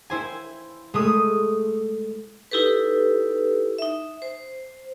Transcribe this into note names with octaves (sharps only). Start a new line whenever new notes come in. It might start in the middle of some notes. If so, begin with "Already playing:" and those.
E4 C5 G#5
G#3 A3 D#6
D#4 E4 G4 A4 B4
D#4 E5
C5